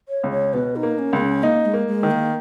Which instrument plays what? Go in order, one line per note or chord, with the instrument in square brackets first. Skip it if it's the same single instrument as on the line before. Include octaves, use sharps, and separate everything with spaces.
[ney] C#5
[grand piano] C#2
[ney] C#5
[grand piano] B2 [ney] B4
[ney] D#4
[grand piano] A#3
[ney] C#4
[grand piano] C#2 [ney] B3
[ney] C#4
[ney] A#3 [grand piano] D#4
[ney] G#3
[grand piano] A#3
[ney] G#3
[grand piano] D#3
[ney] A#3